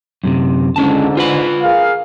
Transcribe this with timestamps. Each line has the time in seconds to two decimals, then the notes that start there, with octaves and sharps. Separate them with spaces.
0.24 F#2 A2 C3
0.76 C#2 G#2 D3 C#4 A5
1.17 F4 B4 B5
1.63 G#4 A#4 F5